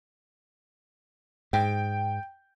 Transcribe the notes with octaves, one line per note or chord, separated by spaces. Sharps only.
G#2 G5